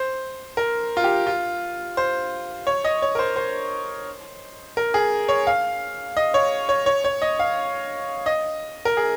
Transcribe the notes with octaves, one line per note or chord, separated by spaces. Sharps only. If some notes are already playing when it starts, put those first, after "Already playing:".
Already playing: C5
A#4
F4
G4
F4
C5
C#5
D#5
C#5
A#4
C5
C5
A#4
G#4
C#5
F5
D#5
C#5
C#5
C#5
C#5
D#5
F5
D#5
A#4
G#4